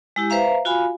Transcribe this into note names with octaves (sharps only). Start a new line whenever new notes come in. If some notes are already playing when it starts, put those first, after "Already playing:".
G#3 E4 G4
B4 C5 E5 F5 A#5
F4 F#4 F5 G#5 B5